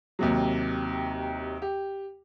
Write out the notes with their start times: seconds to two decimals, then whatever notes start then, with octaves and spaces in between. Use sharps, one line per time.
0.19 D#2 C3 F#3
1.62 G4